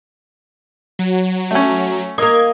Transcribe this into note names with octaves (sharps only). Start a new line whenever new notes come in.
F#3
A3 C#4
A#3 A#4 D#5 G#6